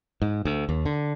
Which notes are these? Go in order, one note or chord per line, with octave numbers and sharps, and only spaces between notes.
G#2
D2
D#2
D3